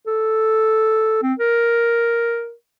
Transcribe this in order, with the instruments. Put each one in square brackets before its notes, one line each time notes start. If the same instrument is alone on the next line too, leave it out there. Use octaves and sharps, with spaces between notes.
[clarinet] A4
C4
A#4